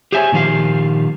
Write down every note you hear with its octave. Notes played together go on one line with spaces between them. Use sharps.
G4 G#4 C5 C#5 E5 G#5
A#2 D#3 F3 D4 G4 F5